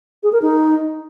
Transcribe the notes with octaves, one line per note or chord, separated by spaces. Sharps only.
G#4
A#4
D#4